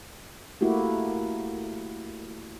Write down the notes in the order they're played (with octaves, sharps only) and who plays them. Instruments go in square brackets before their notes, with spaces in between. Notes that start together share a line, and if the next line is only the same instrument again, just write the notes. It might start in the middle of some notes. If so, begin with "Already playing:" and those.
[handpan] A3 A#3 E4 F#4 G4